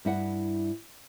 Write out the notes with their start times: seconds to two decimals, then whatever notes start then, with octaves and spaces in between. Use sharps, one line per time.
0.05 G2 E4 F#5